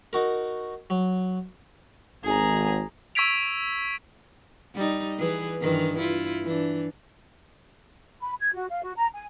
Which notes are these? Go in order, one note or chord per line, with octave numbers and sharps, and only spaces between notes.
D#4 F#4 A#4
F#3
G#1 G#4 A#5
C#6 E6 G#6 B6 D7 F7
G3 D#4
E3 G#4 B4
G2 D#3 E3
E4 F4
E3 D4
B5
G#6
F#4
F5
F#4
A#5
G#5